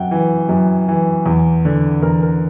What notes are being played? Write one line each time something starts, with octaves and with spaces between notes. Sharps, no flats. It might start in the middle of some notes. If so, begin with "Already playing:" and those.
Already playing: F#2 F#5 G5
E3
F#2
E3
E2
D3
E2 A#4
A#4